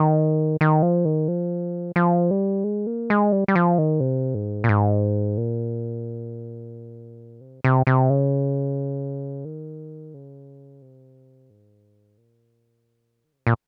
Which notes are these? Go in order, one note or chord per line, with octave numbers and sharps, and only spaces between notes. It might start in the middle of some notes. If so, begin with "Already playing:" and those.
Already playing: D#3
D#3
F3
D#3
F3
F3
G3
G#3
A#3
G#3
G3
G3
F3
D#3
C3
G#2
A#2
G#2
A#2
C3
C3
C3
C#3
D#3
C#3
C3
G#2
A#2
D#3
C#3
C3
A#2